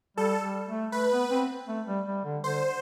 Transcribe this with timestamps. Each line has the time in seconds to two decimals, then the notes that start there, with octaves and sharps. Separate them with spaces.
0.17 G3 A4
0.43 G3
0.68 A3
0.92 A3 B4
1.12 B3
1.31 C4
1.68 A3
1.87 G3
2.07 G3
2.25 D3
2.44 D3 C5